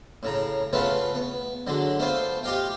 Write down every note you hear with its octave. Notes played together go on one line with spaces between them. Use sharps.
A2 C#3 A#5
C#3 A3 B3 C#4 F4 B4
B3
D3 F#3 G#3
A3 B3 F4 C5
F4 G4 D#5 F5 G5